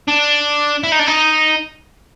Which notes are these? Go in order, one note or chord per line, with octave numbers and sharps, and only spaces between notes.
D4
E4
D#4
D4
D#4